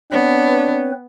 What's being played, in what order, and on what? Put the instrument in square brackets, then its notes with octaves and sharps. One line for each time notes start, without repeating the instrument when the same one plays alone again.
[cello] B3 [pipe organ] C4 B4 [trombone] D4 [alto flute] C#5